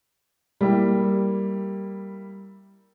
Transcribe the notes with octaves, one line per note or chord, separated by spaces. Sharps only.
G3 A#3 E4 G4